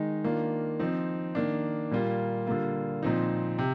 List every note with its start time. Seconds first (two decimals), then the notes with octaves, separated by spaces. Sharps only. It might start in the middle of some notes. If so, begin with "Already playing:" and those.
Already playing: D#3 G#3 D#4
0.24 D#3 A#3 D4 F4
0.79 F3 C4 D#4
1.35 D#3 A#3 D4
1.91 A#2 G3 A#3 F4
2.47 D3 G3 A#3 F4
3.03 A#2 F3 C4 D#4
3.59 C3